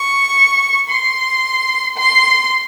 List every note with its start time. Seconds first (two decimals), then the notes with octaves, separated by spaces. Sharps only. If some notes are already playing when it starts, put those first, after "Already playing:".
Already playing: C#6
0.89 C6
1.98 C6